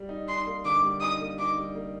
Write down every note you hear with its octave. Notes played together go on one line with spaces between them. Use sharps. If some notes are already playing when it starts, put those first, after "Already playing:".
Already playing: G3
D#4
D#4 C6
A#3
D3 D6
G3
D#4 D#6
A#3
D#4 D6
G3
A#3